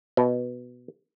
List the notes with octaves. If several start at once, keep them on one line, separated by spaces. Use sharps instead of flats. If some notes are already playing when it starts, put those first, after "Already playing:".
B2